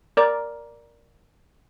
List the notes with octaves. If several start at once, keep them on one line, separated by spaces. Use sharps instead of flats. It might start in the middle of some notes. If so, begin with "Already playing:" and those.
A#4 D5